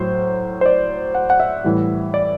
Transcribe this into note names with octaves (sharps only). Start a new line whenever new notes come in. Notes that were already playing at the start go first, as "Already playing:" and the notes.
Already playing: A2 F#3 C5
C5
D5
F#5
F#5
E5
A2 E3 G3
D5